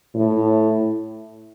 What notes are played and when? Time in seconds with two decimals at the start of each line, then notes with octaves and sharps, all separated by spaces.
0.15 A2